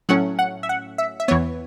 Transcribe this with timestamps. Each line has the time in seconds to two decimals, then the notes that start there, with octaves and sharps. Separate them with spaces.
0.09 A2 F#3 A3 C#4 F#5
0.39 F#5
0.63 E5
0.69 F#5
0.98 E5
1.20 E5
1.28 E2 E3 B3 C#5